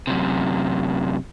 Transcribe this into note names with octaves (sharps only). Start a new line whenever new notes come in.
F#2 C3